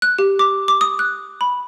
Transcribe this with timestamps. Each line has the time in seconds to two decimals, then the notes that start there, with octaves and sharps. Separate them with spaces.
0.02 F#6
0.19 G4
0.39 D6
0.68 D6
0.81 D#6
0.99 F#6
1.41 B5